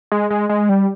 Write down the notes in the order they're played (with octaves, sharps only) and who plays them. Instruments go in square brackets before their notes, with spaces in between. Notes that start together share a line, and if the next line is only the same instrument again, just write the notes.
[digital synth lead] G#3
G#3
G#3
G3